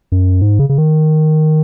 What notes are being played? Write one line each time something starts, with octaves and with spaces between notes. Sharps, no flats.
F#2
G#2
C#3
C#3
D#3